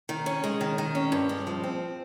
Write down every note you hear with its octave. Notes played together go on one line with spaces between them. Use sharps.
D#3
C#4
G#3
D#3
D#3
C#4
G2
G#3
F3
C4